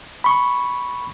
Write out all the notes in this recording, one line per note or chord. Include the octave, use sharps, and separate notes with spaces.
B5 C#6